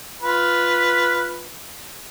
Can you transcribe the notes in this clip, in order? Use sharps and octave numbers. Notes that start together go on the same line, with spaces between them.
F4 B4